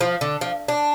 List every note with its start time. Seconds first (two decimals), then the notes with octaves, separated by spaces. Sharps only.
0.01 F3
0.21 D3
0.41 F3
0.68 D4